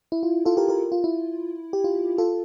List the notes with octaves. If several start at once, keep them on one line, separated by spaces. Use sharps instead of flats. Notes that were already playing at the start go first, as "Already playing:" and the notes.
E4
F4
F4 A4
G4 A#4
G4 A#4
F4
E4
G4
F4
F4 A4